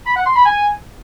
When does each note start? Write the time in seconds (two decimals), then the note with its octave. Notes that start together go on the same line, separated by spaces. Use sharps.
0.07 B5
0.16 F#5
0.26 C6
0.36 B5
0.46 G#5